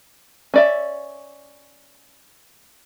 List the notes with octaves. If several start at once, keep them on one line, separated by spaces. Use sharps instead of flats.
C#4 D5 E5